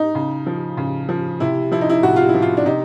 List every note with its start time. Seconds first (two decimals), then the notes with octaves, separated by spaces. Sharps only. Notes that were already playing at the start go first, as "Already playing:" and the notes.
Already playing: D#4
0.15 C#3
0.46 F3
0.77 C#3
1.09 F3
1.40 C3 E4
1.72 F3 E4
1.81 D#4
1.89 E4
2.03 C3 F#4
2.16 F4
2.29 E4
2.34 F3
2.42 F4
2.57 D4
2.66 C3 D#4